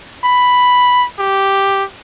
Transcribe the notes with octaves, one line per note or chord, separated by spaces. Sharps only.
B5
G4